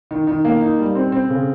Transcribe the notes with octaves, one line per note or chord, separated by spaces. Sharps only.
D#3
D#3
A#3
D#4
G3
C4
C4
C#3